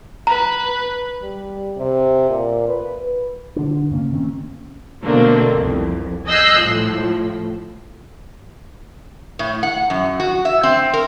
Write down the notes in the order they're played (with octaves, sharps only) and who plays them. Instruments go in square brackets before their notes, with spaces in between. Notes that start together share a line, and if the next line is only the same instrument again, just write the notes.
[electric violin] B4 [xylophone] A#5
[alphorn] G3
C3
A#2
B4
[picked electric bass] D3 D4
G2 C#3 A#3 C#4
D#3 A#3 C4 C#4
[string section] B2 D3 A3 A#3 C4 D4
C2 F2
D#5 G#5 E6 F#6 G6 C7
A2 F3
[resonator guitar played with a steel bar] A2
F#5
F#2
F#4
E5
C4
A#4